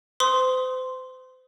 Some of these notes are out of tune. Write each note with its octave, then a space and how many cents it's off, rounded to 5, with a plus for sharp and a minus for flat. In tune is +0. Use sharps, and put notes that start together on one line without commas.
C5 -35 C6 +0 D#6 +15